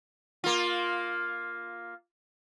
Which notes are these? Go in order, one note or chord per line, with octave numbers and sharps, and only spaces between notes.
A#3 F4